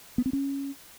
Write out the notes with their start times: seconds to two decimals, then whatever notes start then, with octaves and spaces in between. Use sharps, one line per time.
0.18 B3
0.26 C4
0.33 C#4